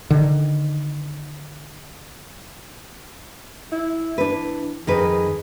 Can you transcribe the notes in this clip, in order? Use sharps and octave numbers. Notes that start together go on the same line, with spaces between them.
D3 D#3
E4
E3 D4 B4
F2 D#3 G#4 B4